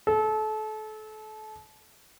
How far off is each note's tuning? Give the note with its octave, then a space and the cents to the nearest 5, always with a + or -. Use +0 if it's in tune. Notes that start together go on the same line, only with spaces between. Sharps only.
A4 -30